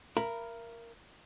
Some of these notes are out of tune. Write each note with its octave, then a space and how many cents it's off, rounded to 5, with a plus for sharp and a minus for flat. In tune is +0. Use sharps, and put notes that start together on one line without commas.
A#4 +0 E5 +45 B5 +0